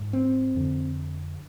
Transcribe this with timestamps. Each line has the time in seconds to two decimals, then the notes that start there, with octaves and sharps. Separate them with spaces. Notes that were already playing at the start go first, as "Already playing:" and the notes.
Already playing: G#2
0.13 C4
0.55 F2 D3